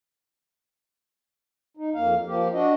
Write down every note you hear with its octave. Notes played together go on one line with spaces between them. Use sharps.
D#4
F2 A#3 F5
F3 A#3 G4
D4 F#4 D#5